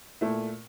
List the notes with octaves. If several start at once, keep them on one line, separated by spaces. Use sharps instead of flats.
A#2 A3 E4